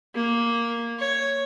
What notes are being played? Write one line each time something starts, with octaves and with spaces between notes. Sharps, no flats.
A#3
C#5